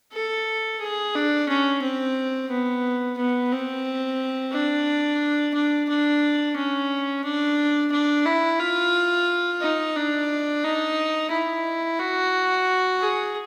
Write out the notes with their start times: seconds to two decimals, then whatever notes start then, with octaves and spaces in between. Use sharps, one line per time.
0.12 A4
0.80 G#4
1.15 D4
1.48 C#4
1.82 C4
2.50 B3
3.17 B3
3.52 C4
4.53 D4
5.54 D4
5.89 D4
6.57 C#4
7.25 D4
7.92 D4
8.26 E4
8.60 F4
9.61 D#4
9.96 D4
10.64 D#4
11.31 E4
11.99 F#4
13.00 G#4